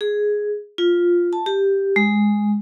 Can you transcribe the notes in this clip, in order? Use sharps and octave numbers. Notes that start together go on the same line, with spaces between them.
G#4
F4
A5
G4
G#3